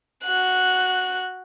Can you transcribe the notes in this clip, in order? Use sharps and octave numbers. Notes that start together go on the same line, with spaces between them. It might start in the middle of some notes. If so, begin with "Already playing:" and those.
F#4 F#6